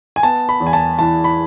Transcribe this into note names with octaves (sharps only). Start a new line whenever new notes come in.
G#5
B3 A5
B5
E2
G#5
A5
E3 A5
B5